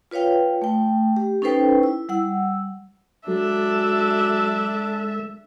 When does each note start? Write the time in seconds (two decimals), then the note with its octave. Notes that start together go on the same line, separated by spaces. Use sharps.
0.11 F4 B4 C#5 F5 G5
0.62 A3 G5
1.17 G4
1.42 C#4 D#4 A4 B4 C5 G5
1.83 E4
2.09 G3 F#5 E6
3.28 F#3 G#3 D4 A4 E5